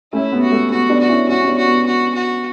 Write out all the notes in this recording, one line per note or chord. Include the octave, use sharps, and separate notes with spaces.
A3 C#4 E4
B3
F#4
A3
B3 F#4
B3 D4
F#4
C#4 E4
C#4 E4 F#4
C#4
B3 D4
F#4
B3
F#4
F#4